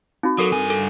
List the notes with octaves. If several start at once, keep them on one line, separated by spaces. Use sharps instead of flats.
C4 D#4 F#4
F#3 A4 A#4 D#6
G2 G#5
A4